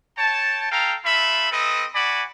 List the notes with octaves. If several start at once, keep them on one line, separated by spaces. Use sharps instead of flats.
C#5 G5 A5
A4 F5 G5 A#5
A3 F4 E5 B5
C4 A4 B4 D#5
F#4 D5 G#5 B5